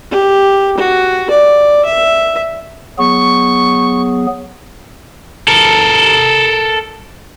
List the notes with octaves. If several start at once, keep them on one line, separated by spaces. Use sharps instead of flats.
G4
F#4
D5
E5
F#3 B3 G#4 C#6
A4 A#4